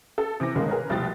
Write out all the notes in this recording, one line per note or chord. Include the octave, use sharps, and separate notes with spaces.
A4
C3 E3 D6 A#6
G1 B2 D#3 G#3 A#3
G#4 A#4 B4 C#5
F1 C2 B2 F3 G5 A6